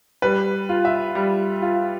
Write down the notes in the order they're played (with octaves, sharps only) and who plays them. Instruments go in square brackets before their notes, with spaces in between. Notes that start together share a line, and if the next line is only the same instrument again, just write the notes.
[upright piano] G3 [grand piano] B4
[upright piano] F4
[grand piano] E5
[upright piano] G3
F4